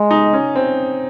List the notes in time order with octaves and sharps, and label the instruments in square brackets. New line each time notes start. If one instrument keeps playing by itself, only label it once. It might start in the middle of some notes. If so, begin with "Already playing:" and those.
Already playing: [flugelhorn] G#3
[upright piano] D#4
C#4
C4